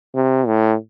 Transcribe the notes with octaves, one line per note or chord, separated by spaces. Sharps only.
C3
A2